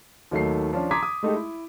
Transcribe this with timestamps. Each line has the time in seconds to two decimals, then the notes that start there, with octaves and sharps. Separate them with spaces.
0.31 D#2 D#3 F#3 A3 C#5 C7
0.73 F3 C#4 D4
0.91 A#5 C6 D6 D#6 G#6 B6
1.03 D#6
1.23 G#3 A3 D#4 G4 G#4
1.36 E4